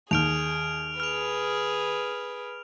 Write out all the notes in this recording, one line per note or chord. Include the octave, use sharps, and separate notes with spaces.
D#2 G#4 F6 D7 F7
G#4 B4 F6 F7